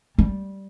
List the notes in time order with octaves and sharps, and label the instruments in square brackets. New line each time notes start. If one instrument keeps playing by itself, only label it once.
[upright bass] G3